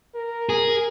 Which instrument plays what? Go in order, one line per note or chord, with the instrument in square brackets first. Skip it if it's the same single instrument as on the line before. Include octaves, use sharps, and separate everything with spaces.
[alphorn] A#4
[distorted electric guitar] G#4